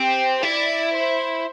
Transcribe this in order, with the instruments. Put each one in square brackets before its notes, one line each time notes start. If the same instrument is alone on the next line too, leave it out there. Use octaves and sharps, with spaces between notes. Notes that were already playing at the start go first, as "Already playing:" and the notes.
Already playing: [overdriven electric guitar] C4 [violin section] G4
[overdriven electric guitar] E4 [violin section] D5
[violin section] C5